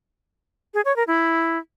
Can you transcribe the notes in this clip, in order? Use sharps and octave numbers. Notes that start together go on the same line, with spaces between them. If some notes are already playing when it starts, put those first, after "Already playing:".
G#4
C#5
A#4
E4